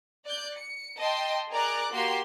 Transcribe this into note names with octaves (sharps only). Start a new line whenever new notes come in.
D5 F#6 G6
C#7
D#5 G5 A5 C6
G#4 A#4 D5 A#5 D6 F#6
A#3 F#4 G4 C6